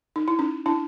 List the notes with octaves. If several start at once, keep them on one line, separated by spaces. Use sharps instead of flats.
D#4
E4
C#4 D#4
D4 E4